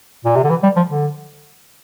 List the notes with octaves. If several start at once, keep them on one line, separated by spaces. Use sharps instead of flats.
A#2
C3
D3
E3
G3
F3
D3